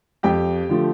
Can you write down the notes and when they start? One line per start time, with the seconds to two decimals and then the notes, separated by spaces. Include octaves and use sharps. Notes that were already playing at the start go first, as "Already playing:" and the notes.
0.23 F2 G4 G5
0.69 D3 F3 A3